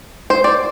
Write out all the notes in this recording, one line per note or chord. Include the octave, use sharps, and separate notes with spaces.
C5
D5